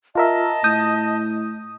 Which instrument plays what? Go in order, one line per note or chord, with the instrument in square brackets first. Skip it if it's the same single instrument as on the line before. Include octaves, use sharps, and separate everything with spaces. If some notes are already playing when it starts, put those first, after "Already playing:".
[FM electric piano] F4 A#4 E5 [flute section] D#5 A5
[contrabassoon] A2 [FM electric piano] D#6 [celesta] G6